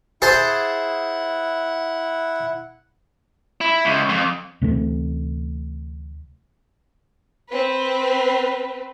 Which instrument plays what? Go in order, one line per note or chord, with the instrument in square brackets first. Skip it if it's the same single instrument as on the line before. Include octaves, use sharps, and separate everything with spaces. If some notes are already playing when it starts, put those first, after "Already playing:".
[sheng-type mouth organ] E4 F#5 [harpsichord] G#4 C5 A5
[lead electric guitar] E4
C#2
F2
[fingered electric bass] D2 C3 E3 A3
[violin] C4 B4